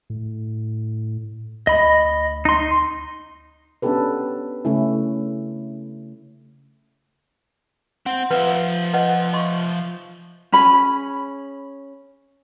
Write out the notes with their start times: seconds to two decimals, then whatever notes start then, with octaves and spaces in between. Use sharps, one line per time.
0.10 A2
1.67 D2 D#5 B5
2.45 D#4 C6
3.82 B3 C#4 D4 G4 A4 B4
4.65 C#3 A3 C#4 E4
8.06 C4 F#5
8.31 F3 B4 E5 F#5
8.93 B4 D#5 F#5
9.33 D#5 C6 C#6
10.52 C#4 G#4 B5